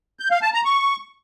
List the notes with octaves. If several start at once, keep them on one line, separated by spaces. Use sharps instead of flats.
G6
F5
A5
A#5
C#6